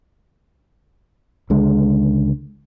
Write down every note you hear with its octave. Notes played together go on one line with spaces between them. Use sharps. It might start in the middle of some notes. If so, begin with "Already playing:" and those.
C#2 D3 G#3